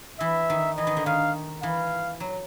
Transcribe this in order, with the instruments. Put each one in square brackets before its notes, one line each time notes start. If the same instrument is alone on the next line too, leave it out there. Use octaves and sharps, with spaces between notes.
[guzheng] E3 [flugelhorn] E5
[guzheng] D#3
[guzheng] E3 [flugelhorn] D#5
[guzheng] D#3
D3
[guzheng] D#3 [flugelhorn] F5
[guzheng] E3 [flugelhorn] F5
[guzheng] F#3